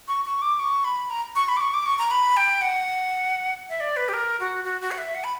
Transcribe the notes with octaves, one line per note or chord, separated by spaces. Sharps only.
C#6
C#6
D6
C#6
B5
A#5
C#6
B5
D6
C#6
D6
C#6
A#5
B5
G5
F#5
E5
D5
B4
G4
A#4
F#4
F#4
F#4
F#5
E5
F#5
B5